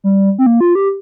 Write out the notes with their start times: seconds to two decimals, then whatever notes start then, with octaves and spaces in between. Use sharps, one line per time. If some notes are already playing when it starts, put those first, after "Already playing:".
0.04 G3
0.38 C4
0.46 A#3
0.61 F4
0.75 G4